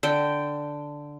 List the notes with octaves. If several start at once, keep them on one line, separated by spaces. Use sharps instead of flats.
D3 G5